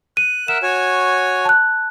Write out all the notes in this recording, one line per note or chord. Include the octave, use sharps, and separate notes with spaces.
F#6 D#7
A#4 E5 F#5 E7
F#4 C#5 G#5
A5 F#6